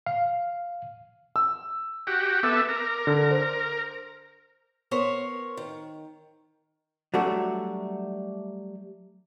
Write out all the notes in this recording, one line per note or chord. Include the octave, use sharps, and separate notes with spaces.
F5
E6
F#4 G4
B3 A4 E5 D6
A#4
D3
C5
B3 A#4 C5 C#5
D#3
F#3 G3 A3 D4 F#4